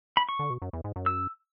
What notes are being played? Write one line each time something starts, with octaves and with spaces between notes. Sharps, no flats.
B5
C#6
D3
B2
F#2
E2
G#2
F#2
E6